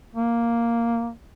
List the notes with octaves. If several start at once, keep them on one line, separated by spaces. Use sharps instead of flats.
A#3